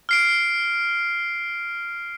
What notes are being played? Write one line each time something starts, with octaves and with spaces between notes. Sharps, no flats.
F6 C7 D7